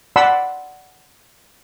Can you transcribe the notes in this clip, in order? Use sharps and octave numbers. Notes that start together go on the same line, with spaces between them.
D5 F#5 A5 B5 C6 E6